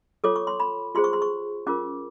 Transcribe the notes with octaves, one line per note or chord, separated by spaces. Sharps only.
F4 A4 C#5 D6
C#6
C6
B5
F4 G#4 C5 C6
C#6
C6
C#6
C#4 F4 A#4 D6